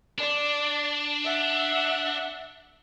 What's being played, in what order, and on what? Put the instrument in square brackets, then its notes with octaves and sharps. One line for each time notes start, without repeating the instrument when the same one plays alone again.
[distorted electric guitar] D4 [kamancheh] D5
[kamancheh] E5 F#5